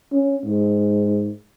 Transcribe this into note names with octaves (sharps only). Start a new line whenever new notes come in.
C#4
G#2